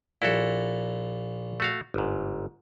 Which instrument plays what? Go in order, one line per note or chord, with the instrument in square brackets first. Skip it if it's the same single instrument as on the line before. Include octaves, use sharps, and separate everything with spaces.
[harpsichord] A#1 A#2 [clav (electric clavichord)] E4 F#4 A4
[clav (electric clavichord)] A3 F#4 F5
G1 G#2